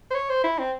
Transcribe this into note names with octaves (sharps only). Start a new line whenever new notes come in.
C5
C#5
C5
E4
C4